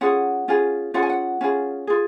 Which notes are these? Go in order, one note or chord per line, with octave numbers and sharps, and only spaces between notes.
C#4 F4 G#4 F#5
C#4 F4 G#4
C#4 F4 G#4 F#5
G#5
F#5
C#4 F4 G#4
F4 G#4